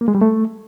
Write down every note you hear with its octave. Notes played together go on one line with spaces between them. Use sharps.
A#3
G#3
G3
A3